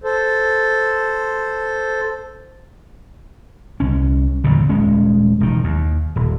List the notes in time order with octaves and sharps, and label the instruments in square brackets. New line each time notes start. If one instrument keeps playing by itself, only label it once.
[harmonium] A4 C5
[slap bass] C2 C#4
G1 E2 A#2 C#3
D#1 G#3 C#4
E1 D#3
D#2
D#1